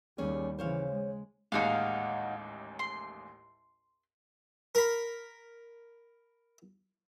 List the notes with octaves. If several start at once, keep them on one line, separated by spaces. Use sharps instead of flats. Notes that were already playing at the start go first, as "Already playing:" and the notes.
D#2 G3 C#4 G#4
C#3 E3 C5 C#5 F5
G#3
A1 D#2 G#2 D#4 F#4 F5
C6
A#4 B5